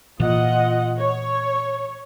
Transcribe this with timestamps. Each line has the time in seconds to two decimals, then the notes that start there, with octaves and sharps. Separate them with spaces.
0.20 A#2 E3 F4 D#5 F#5
0.98 C#5